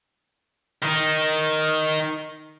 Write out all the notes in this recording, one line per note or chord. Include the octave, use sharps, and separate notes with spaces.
D#3 D#4